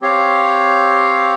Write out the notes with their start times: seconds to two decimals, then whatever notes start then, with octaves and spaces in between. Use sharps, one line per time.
0.02 C4 G4 C#5 F5